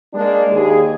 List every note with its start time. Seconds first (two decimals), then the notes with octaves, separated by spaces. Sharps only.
0.13 G#3 A#3 D4
0.51 D#2 G#4